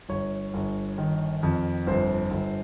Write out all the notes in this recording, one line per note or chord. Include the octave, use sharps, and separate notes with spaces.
G1 C#5
G1
D#3
F2
G1 C5
G1